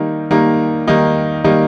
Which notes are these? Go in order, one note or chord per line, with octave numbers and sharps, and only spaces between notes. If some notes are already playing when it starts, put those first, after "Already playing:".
Already playing: D#3 G3 A#3 D#4
D#3 G3 A#3 D#4
D#3 G3 A#3 D#4
D#3 G3 A#3 D#4